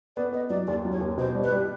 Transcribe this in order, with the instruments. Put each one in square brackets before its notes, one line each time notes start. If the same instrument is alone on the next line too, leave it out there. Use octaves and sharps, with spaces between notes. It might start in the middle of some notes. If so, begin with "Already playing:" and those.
[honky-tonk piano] B3 [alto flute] D5
[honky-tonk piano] B3 [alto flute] D#5
[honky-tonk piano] F#3 [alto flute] D5
[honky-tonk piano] D#2 [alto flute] D5
[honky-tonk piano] F#3
[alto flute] C#5
[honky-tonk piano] D#2
[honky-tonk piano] B2 [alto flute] C5
[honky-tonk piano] G3
[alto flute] B4
[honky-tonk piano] G3